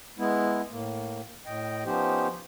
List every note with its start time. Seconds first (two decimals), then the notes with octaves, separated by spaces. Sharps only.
0.19 G#3 B3 E4
0.71 A2 A#3
1.46 A2 D#5 G5
1.85 F3 B3 C#4 D#4 G4 C5